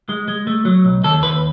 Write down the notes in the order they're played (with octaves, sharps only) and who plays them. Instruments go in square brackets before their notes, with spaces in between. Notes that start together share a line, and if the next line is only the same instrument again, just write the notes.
[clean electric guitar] G#3
G#3
A3
F#3
B1
D#2 A4
D#2 B4